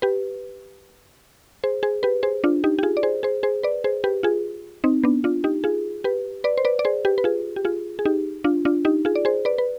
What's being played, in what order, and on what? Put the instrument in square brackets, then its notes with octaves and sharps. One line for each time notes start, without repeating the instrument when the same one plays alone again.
[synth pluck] G4 B4
G#4 C5
G#4 C5
G4 B4
G#4 C5
D4 F4
D#4 G4
G4
F4 G#4
D5
G#4 C5
G#4 C5
G#4 C5
B4 D5
G#4 C5
G4 B4
F4 G#4
C4 D#4
B3 D4
D4 F4
D#4 G4
F4 G#4
G4 B4
B4 D5
C5
B4 D5
D5
G#4 C5
G4 B4
B4
F4 G#4
G4
F4 G#4
G#4
D#4 G4
D4 F4
D4 F4
D#4 G4
F4 G#4
D5
G#4 C5
B4 D5
B4